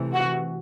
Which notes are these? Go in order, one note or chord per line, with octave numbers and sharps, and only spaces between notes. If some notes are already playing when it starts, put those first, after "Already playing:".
Already playing: C3 E3 A3
F#4